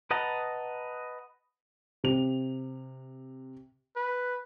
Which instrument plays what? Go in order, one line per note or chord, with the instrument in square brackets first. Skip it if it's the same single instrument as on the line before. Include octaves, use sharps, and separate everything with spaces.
[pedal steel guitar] B4 D#5 F#5 A5 A#5
[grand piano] C3 F7
[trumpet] B4